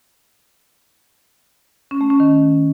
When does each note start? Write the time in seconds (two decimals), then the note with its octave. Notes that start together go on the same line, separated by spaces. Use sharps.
1.91 C#4
2.01 A3
2.10 C#4
2.20 D#3